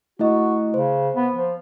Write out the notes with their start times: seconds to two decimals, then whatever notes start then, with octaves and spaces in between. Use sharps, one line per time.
0.19 A3 E4 F#4 D#5
0.74 C#3 C5
1.14 B3
1.34 F3